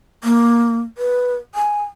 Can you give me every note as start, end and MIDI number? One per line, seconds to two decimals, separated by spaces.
0.24 0.80 58
0.98 1.35 71
1.55 1.83 80